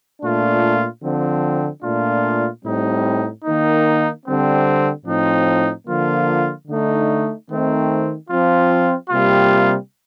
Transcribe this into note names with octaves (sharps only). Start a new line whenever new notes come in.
A#2 A3 D4 F4
D3 F3 C4
A#2 A3 D4 F4
A2 G3 C4 D#4
D#3 A#3 D#4
D3 G3 C4
A2 F3 C4 D#4
D3 F3 A#3 F4
D3 A3 D#4
D#3 A3 C4 D#4
F3 C4 F4
C3 G3 A#3 F4